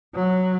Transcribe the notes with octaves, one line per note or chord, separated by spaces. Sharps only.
F#3